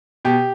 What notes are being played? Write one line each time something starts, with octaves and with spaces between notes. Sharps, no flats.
B2 G4